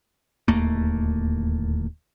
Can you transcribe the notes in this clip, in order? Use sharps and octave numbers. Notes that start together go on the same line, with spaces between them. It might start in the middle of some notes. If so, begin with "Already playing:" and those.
D1 D#2 A3 A#3